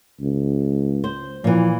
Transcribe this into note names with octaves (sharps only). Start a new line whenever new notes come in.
C#2
C5
A#2 E3 F3